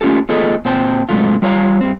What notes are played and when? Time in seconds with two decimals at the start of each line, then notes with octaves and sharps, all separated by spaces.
0.01 A3 C#4 F4 G4 A4
0.29 A3 B3 F4 G#4 A4 D#5
0.65 A#2 C4 C5 G5 A5
1.09 G#2 C3 F#3 G#3 A3 F4
1.42 G3 F4 C#5 E5 F5 A#5
1.81 G2 C4